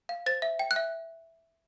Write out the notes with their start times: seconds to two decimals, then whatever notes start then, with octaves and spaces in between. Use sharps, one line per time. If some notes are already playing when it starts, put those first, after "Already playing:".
0.09 F5
0.26 C5 A6
0.42 E5
0.59 G5
0.71 F#6
0.76 E5